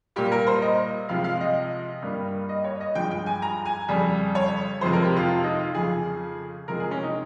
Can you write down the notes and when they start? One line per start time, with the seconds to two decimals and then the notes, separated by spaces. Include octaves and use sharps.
0.16 A#2 G3 A#3 G4
0.32 A#4
0.47 C5
0.62 D#5
1.09 C3 F3 G#3 F5
1.24 F5
1.41 D#5
2.02 G2 G3 A#3
2.49 D#5
2.64 C#5
2.80 D#5
2.95 G2 F3 G#3 G5
3.11 G5
3.26 G#5
3.42 A#5
3.66 G#5
3.88 F2 C#3 G3
4.35 C#5
4.81 F2 C3 F3 G#3 C5
4.93 A#4
5.05 G4
5.17 F4
5.28 F4
5.44 D#4
5.59 F4
5.74 F2 C#3 F3 G#4
6.68 C3 F3 G#3 A#4
6.80 G#4
6.91 C#4
7.03 D#4